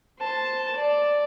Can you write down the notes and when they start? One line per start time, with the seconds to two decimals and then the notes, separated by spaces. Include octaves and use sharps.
0.20 C5 A5
0.76 D5